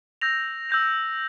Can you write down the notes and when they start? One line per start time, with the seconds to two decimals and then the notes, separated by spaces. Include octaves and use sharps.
0.21 E6 G6 A#6 F7
0.70 E6 G6 A#6 F7